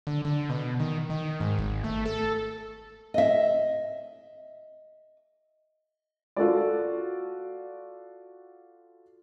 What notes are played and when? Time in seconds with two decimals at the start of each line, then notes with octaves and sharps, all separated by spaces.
0.07 D3
0.25 D3
0.50 B2
0.80 D#3
1.10 D#3
1.40 G#2
1.59 G#1
1.84 A3
2.06 A4
3.14 D#5 E5
6.36 F4 F#4 A4 D5